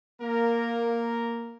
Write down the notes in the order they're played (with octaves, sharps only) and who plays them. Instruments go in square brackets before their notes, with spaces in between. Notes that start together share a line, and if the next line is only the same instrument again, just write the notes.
[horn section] A#3 A#4